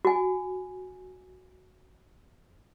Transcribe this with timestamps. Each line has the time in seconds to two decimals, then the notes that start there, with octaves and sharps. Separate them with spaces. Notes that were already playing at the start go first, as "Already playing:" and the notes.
0.05 F#4 G#5